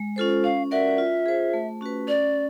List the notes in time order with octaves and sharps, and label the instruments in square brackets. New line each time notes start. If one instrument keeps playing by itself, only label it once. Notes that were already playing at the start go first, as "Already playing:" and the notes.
Already playing: [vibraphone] G#3
C#4 F4 A4 C5
[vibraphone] C#4 [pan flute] F5
[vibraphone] F#4 A#4 D5 F#5 [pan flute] E5
[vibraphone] F4
G#4 C5
A3
C#4 F#4 B4
[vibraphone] C#4 [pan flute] D5